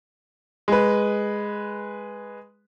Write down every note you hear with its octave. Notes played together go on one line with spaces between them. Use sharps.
G#3 B4